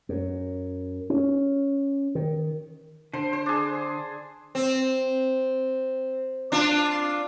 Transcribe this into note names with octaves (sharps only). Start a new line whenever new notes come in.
F#2
C#4
D#3
D3 C5
C5
D4 G#4
C4
D4 F4